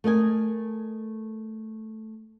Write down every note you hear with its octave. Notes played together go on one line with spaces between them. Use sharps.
A3 A#4 D#5 G#5